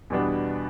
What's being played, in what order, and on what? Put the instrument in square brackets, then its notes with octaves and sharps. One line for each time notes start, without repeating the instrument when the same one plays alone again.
[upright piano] E2 B2 G3 B3 D4